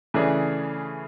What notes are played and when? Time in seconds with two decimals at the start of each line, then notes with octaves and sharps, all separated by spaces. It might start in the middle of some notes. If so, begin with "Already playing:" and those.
0.14 C#3 E3 A3 D4 G#4